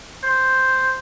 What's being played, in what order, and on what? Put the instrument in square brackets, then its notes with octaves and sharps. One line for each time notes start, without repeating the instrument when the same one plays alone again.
[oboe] C5